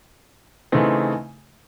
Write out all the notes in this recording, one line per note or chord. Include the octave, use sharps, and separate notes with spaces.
C#3 E3 A3 C4 D#4